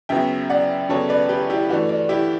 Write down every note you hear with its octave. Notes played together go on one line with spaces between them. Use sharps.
F#2 C#3 F#3 B3 E5 G5
D5 F#5
F#2 C#3 F#3 B3 A4 C#5
B4 D5
G4 B4
E4 G4
G2 E3 A3 D4 F#4
D4
E4 G4